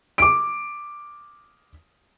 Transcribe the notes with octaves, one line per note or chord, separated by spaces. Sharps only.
D6 D7